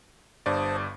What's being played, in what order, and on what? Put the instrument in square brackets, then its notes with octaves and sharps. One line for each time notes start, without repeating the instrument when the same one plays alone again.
[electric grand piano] G1 G2 D5 [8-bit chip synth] C5 A5 D#6